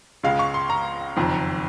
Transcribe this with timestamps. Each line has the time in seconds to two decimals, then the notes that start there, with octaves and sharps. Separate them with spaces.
0.23 C#2 C#3 G#3 F5
0.39 C#6
0.54 C6
0.70 A#5
1.16 F#1 F2 D#3